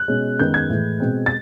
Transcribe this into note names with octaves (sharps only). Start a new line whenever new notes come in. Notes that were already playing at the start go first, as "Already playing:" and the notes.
Already playing: F#6
B2 G#3 C#4
F#2 D#3 G#3 B3 G6
G#6
A2 E3 G#3
B2 G#3 C4
A6